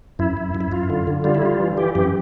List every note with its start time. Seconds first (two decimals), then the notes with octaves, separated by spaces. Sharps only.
0.19 F#2 E4
0.37 F#2
0.55 F#2
0.61 E4
0.72 F#2 F4
0.90 D3
1.07 D3
1.24 G3 F4
1.35 E4
1.42 G3 F4
1.60 E3
1.77 E3 G4
1.95 F#2 G4